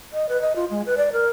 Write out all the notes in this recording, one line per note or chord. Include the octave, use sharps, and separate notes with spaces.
D#5
B4
D#5
F4
G#3
B4
D5
A#4